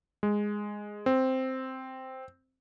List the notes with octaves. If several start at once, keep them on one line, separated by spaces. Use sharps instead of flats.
G#3
C4